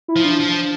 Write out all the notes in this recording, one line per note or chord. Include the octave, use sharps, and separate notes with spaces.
E4
F3
D4
F3